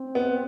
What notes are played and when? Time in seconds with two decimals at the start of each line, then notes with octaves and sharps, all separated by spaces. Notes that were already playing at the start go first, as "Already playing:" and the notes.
Already playing: C4
0.15 B3